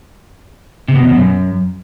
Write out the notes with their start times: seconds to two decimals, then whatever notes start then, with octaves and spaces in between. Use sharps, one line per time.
0.88 C3
0.95 B2
1.02 E2
1.09 B2
1.16 F#2